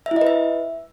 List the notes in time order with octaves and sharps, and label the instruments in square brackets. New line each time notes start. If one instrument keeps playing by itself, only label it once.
[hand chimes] E5
E4
D#5
B4
E5